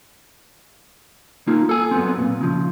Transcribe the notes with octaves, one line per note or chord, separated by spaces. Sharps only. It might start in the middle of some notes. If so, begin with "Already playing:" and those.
A#3 D#4 F4
A4 G#5
F#2 B3 C4
A#2
C#3 F3